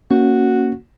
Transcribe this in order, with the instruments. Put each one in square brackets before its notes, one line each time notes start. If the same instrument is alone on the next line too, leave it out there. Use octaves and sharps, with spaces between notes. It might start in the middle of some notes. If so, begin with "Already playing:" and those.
[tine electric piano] A#3 [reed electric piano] C#4 [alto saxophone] F#4